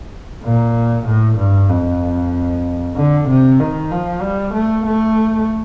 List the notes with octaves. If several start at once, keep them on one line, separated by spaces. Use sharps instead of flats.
A#2
A2
G2
F2
D3
C3
D#3
F3
G3
A3
A3